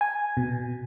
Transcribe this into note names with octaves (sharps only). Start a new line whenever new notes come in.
G#5
B2